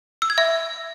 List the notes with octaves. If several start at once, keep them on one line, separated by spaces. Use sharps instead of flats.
E6
G#6
E5